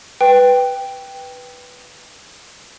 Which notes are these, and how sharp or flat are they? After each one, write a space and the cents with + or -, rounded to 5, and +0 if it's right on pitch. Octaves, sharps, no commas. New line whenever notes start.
B4 +0 G5 +0